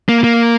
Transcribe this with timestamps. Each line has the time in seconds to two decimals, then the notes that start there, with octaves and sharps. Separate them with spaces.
0.09 A#3
0.24 A#3